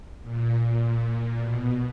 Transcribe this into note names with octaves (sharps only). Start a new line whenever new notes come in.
A#2
A#2
B2